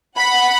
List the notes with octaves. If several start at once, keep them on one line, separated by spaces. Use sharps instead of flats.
F#5 B5